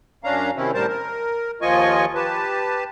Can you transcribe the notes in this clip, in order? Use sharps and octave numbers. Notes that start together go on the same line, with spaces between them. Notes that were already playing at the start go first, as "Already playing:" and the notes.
F#2 C#4 D4 F5 A#5
C3 D#3 C4 C#4 E4
A2 G3 A#4 C5 A5
A#4
D#2 F3 F4 D#5 G#5 C#6
G4 B4 A5